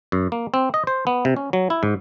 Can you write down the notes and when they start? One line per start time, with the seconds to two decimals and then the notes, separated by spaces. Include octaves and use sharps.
0.12 F#2
0.32 A#3
0.54 C4
0.74 D#5
0.87 C5
1.07 B3
1.25 C3
1.37 C#4
1.53 F#3
1.70 E4
1.83 G#2